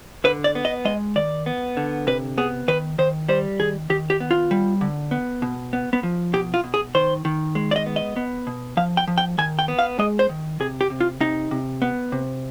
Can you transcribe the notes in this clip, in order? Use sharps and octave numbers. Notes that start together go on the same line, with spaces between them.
D3 B4
D5
B3
D#5
G#3 D#5
D#3 D5
B3
D3
C3 B4
B3 G#4
D#3 B4
D#3 C5
G3 C5
D#3 G#4
D#3 G4
G4
B3
F4
G3
D3
B3
B2
B3
B3
F3
B2 G4
F4
B2
G#4
D#3 C5
D#3
G#3
D5
D#5
B3
D#5
B3
B2
F3 F5
G5
F3
G5
D#3 G#5
G5
B3
F5
G#3 D#5
C5
D#3
C3 G#4
G4
C3
F4
C3 D#4
C3
B3
C3